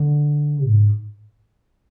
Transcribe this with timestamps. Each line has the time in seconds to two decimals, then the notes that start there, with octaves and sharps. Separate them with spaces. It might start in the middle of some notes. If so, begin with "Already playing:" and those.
Already playing: D3
0.67 G#2